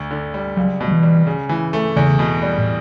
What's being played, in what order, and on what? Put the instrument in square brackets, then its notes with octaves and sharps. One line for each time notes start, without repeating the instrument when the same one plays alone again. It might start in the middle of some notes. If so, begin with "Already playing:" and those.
Already playing: [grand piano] D2
D3
G3
[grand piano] C#2 [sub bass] F#3
[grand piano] B2
[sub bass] F#3
E3
[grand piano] G3
C#3
E3
A3
[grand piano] E2 [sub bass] C#3
[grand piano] B2
G3
[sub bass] A2